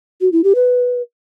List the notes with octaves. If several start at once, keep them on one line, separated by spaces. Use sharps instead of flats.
F#4
E4
G4
B4